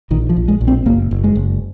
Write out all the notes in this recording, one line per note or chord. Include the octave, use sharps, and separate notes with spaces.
A#1 D#3
F3
A#1
G#3
A#1
C4
F#1 A#3
F#1
G#3
F#1